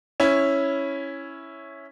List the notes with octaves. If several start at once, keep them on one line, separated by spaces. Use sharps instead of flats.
C#4 E4